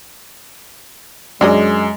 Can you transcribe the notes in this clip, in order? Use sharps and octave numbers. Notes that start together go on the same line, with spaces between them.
F#2 G#3 D4 G#4 D#5